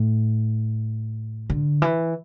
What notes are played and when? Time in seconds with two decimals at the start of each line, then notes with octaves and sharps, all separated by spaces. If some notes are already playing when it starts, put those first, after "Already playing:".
Already playing: A2
1.50 D3
1.82 E3